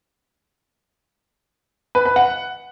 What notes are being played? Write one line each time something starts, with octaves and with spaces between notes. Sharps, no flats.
B4
B4
F#5